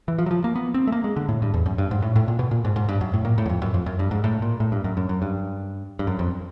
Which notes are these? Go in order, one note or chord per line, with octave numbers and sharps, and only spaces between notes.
E3
F3
F#3
F3
A#3
B3
C4
A3
A#3
G#3
D3
A2
G2
E2
F#2
G2
G#2
A2
A2
A#2
B2
A#2
G#2
G#2
G2
F#2
A2
A#2
A2
E2
F2
F#2
F2
F#2
G2
G#2
A2
A#2
A2
G2
F#2
F#2
F#2
G2
G2
F#2
F2